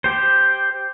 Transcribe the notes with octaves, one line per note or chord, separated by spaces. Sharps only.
G4 C5